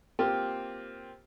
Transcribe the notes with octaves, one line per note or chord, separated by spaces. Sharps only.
A#3 C4 F4 G4